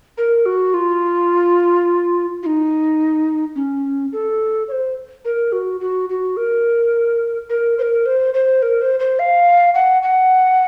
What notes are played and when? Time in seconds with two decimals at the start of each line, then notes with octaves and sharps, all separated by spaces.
0.17 A#4
0.46 F#4
0.74 F4
2.43 F4
2.46 D#4
3.56 C#4
4.12 A4
4.68 C#5
4.72 C5
5.25 A#4
5.52 F#4
5.80 F#4
6.09 F#4
6.37 A#4
7.50 A#4
7.78 C5
7.82 A#4
8.06 C5
8.34 C5
8.62 A#4
8.81 C5
9.00 C5
9.19 F5
9.74 F#5
10.03 F#5